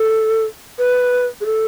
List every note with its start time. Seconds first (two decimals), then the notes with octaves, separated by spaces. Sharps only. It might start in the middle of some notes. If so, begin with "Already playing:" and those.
Already playing: A4
0.79 B4
1.41 G#4
1.46 A4